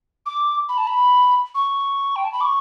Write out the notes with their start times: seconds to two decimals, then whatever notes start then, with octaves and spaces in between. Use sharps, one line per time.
0.26 D6
0.69 B5
0.78 A5
0.87 B5
1.55 C#6
2.16 G5
2.25 A5
2.33 B5
2.41 D6
2.45 C#6